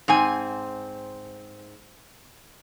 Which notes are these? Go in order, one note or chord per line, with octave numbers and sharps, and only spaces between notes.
G#2 C4 G#5